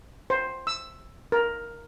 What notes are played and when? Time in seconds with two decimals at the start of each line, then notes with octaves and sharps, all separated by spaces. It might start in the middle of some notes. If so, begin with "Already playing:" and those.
0.30 C5
0.67 E6
1.32 A#4